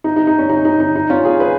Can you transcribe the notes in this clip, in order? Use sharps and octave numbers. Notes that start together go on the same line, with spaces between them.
D#4
D#4
D#4
C#4
D#4
D#4
D#4
D#4
C#4 F4
F4 G#4
G#4 B4